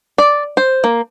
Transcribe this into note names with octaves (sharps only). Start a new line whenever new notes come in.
D5
C5
A#3